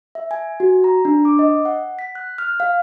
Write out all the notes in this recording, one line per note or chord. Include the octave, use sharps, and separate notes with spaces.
E5
G#5
F#4
A#5
D4
D6
D#5
F#5
B6
F#6
F6
F5